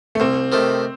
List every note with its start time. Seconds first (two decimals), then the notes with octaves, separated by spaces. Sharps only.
0.15 A3
0.20 C2 C4
0.52 C3 D#3 A3